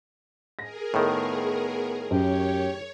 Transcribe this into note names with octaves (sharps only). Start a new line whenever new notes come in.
G#4 A#4 A#6
A2 D#3 B3
F#2 G4 C#5